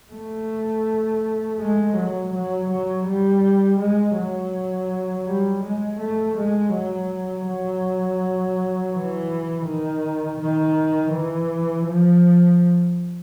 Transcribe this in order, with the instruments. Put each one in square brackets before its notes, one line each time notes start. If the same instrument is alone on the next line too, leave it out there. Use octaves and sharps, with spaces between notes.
[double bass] A3
G#3
F#3
F#3
F#3
G3
G#3
F#3
G3
G#3
A3
G#3
F#3
F#3
E3
D#3
D#3
E3
F3